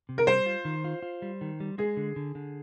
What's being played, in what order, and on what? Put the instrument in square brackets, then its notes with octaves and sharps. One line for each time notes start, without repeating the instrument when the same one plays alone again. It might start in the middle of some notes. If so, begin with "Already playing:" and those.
[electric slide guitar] C3
[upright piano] A#4
[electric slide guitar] G3 [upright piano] C5
[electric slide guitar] F4
D#3
F4
F4
G3
D#3
G3
[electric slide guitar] G#3 [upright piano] G#4
[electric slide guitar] D3
D3
D3